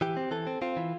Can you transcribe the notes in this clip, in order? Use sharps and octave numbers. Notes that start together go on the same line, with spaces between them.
E3 G4
C4
E3 A4
C4
C4 F4
E3